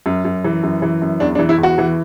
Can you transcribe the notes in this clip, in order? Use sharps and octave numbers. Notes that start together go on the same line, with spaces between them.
F#2
F#2
E3
F#2
E3
F#2
E2 D4
D4
E3
E4
E2
F#4
E3